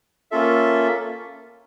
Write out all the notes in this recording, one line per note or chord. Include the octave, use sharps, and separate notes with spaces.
A#3 C#4 F4 A4 E5